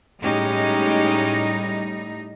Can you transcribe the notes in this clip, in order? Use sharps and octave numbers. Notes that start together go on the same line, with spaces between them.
A2 G3 G#3 C#4 D#4 G4